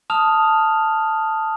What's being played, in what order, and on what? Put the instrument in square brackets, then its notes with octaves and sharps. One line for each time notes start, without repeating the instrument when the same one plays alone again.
[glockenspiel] A5 D#6 F6 F7